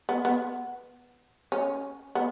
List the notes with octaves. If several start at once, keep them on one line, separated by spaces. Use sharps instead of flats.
B3
B3
C#4
B3